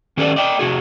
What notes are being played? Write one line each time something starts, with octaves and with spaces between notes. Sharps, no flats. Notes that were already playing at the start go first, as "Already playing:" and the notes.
D#3 C#4 G4 A4 B4 D5
D5 D#5 G5
C3 F#4 G#4